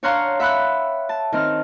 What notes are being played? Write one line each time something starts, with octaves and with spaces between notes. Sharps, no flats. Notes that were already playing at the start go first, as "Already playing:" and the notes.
D4 C#5 F5 F#5 A#5 C6
E5 F#5 B5 F#6
A5
D#3 C4 F6